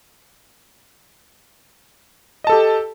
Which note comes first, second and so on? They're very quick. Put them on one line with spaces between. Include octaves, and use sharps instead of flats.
D#5 A5 A4 G4